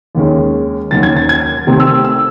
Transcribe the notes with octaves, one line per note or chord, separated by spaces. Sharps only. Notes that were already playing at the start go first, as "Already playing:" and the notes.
D#2 D#3 G#3 C#4
D#2 D#3 F#3 C#4 A6
G#6
A6
G#6
C3 D#3 A3 C4
E6
E6